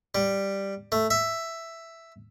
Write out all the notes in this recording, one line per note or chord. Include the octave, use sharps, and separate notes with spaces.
G3
A3
E5